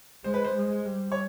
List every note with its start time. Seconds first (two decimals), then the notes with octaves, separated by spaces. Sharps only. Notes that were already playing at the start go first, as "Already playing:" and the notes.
0.24 G#3 C5
0.34 B4
0.44 C5
0.55 G#3
0.86 G3
1.12 C#5